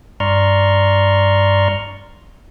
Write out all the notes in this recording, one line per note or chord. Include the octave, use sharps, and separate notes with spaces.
G2 D5 A#5 C6 C#6 F6